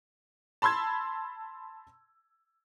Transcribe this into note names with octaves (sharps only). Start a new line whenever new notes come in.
A5 B5 C6 E6 G#6